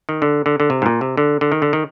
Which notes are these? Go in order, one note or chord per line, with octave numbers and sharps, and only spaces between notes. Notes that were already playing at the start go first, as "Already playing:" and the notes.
D#3
D3
D3
D3
C3
G#2
A#2
C3
D3
D3
D#3
D3
D#3